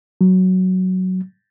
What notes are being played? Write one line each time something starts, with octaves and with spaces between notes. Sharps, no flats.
F#3